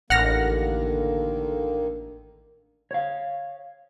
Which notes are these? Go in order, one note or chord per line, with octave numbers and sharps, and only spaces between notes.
A1 D3 D#3 A#3 F#5 F6 A#6
C#5 F5